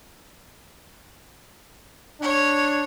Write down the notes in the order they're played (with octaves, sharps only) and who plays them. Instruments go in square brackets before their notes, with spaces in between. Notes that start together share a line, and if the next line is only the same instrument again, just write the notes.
[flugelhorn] D4 [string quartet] C#5